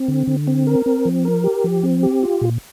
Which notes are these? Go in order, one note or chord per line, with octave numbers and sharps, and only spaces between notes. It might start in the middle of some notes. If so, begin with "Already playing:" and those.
Already playing: C4
D3
D3
C4
A#4
C4
F3
A#4
G4
F3
C4
G4
F4
A#2